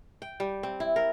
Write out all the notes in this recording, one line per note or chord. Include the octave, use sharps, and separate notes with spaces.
G5
G3
C4
E4
A#4